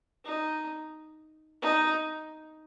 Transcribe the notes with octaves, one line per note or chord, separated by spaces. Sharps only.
D#4
D#4